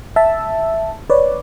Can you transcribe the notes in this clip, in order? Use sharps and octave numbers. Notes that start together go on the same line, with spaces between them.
E5 A5
B4 C#5 D5